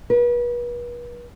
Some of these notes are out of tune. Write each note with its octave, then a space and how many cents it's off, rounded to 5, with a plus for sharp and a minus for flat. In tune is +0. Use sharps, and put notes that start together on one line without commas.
B4 -40